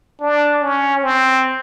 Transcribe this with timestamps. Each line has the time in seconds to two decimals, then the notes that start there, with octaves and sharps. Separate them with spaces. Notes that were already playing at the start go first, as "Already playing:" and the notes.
0.21 D4
0.62 C#4
1.03 C4